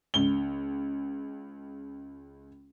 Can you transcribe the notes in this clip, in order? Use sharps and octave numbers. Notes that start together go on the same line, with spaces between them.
C#2 G7